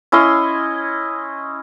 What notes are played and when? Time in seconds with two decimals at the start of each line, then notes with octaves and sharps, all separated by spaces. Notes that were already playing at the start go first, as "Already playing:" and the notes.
0.12 C#4 E4 D#5 C6